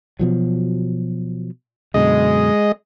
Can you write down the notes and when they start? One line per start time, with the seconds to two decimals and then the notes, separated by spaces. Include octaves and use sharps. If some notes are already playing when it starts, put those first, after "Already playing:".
0.19 B2 F3 F#3
1.94 F#2 B2 D3 G#3 D#5